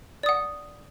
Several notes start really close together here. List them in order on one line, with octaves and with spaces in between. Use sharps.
D5 D#6 F#5